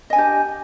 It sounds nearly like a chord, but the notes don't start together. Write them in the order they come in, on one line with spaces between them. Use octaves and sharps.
D#5 G#5 D4 G4